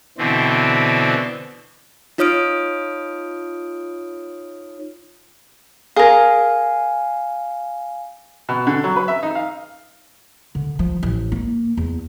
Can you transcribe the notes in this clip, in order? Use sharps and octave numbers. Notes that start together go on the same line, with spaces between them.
B2 D3 E3 C4
D#4 F4 C#5 D#6 F6 D7
G#4 A#4 F5 G#5
B2
D3
F#3
B4
E5
D#4
F5
D3
F3
A1
A#3
E2